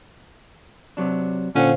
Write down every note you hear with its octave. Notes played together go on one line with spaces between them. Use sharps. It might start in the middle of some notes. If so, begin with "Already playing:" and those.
C3 F#3 D4
A#2 D3 C#4 C5 F5 F#5